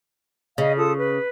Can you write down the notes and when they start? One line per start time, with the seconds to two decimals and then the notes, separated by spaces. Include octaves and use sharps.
0.58 C#3 D#5 F5
0.76 F4 A4 D#6
0.99 B4